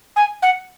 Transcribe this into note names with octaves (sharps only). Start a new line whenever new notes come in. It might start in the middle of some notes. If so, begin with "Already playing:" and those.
G#5
F#5